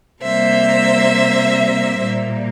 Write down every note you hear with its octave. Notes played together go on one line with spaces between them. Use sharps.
C3 G3 A#3 C5 E5
A#2 G3 A#3